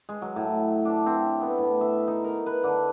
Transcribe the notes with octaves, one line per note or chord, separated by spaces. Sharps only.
G#3
F#3
A2
D4
C4
B3
A2
E5
D#4
A#4
B4
D3